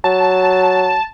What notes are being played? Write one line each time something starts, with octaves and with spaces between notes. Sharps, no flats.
F#3 A5